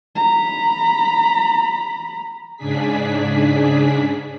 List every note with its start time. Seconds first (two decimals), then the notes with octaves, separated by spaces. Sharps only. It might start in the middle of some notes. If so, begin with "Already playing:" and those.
0.16 A#5 B5
2.56 G#2 C#3 D4 G#4 B6